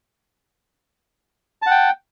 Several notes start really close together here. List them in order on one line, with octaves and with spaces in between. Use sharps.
A5 F#5 G5